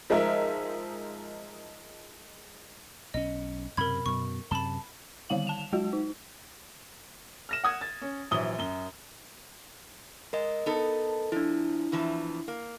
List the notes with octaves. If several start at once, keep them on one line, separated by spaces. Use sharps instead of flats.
F3 G#3 D#4 A#4 E5
B1 C#4 D#5
B1 F#2 C3 A#4 B5 G#6
F#2 B2 C#6
F#2 C3 A5 B5 G7
D3 D#3 G3 F5 F#7
A5 E7 F7
F#3 G#3 F#4
D#4
F6 A#6 E7
F#5 D#6 G#6
A6
C#4
A#1 E3 F#3 D#6 G7
F#2 G7
G#3 A#4 D#5
B3 D#4 A4
F3 D4 E4
E2 E3 F3
A#3